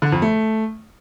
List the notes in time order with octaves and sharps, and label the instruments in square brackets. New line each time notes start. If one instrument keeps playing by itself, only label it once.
[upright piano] D3
F2
A3